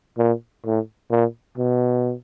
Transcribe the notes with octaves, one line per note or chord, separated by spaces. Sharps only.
A#2
A2
A#2
B2